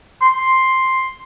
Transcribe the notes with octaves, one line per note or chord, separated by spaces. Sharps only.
C6